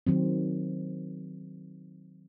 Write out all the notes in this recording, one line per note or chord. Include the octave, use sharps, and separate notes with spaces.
D#3 F#3 C4